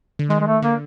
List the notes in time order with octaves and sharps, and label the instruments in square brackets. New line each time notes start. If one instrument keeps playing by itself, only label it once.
[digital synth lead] D3
[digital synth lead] D#3 [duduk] G#3
[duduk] G#3
A3
[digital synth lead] D3 [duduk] A#3